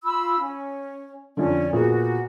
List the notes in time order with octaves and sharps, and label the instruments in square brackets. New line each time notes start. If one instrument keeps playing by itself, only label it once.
[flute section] F4 B5 E6
C#4
[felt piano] F2 D3 [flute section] C#4 D5
[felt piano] A#2 B3 G#4 [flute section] F#4